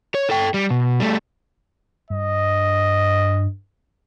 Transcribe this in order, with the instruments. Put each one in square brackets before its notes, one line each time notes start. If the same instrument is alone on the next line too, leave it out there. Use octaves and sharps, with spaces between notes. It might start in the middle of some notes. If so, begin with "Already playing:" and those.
[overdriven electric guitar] C#5
A4 G5
G3
B2
G3 A3
[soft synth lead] G2 [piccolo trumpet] D#5